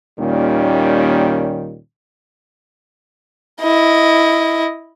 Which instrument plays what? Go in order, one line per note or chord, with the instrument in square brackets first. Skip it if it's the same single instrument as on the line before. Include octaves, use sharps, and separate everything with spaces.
[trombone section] D#2 A#2 D#3 G3 C#4
[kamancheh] E4 D#5